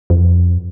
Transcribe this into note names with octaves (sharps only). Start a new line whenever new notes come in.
F2